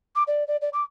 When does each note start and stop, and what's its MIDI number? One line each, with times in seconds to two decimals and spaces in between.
0.16 0.23 86
0.27 0.46 74
0.48 0.57 74
0.62 0.69 74
0.73 0.84 86